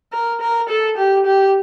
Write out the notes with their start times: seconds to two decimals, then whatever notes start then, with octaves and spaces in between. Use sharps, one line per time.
0.12 A#4
0.41 A#4
0.69 A4
0.97 G4
1.25 G4